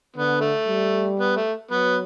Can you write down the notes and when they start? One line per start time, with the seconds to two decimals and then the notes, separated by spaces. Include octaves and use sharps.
0.16 D3 B3
0.41 A3
0.68 G3
1.20 B3
1.36 A3
1.71 F#3 B3